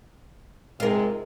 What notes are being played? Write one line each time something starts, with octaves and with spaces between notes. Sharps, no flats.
G#2 C3 G#3 F4 A#4